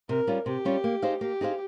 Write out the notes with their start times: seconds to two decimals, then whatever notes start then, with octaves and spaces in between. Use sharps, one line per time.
0.09 C3 A#4
0.27 G3 C#4 F4
0.46 C3 G4
0.65 G3 C#4 F4
0.84 A#3
1.02 D#4 G#4 C5 F5
1.21 A#3 G4
1.41 D#4 G#4 C5 F5